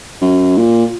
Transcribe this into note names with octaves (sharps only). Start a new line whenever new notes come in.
F#2
A#2